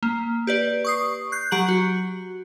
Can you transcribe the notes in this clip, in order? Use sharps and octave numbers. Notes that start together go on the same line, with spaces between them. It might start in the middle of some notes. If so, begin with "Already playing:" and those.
A#3
G4 B4 D5
C#6 D#6 C7
F#6 G6 C7
F#3 G4 A#5 G6 F#7
F#4